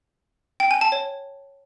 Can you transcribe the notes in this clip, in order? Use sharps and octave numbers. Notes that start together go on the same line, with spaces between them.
G5
G#5
A5
C#5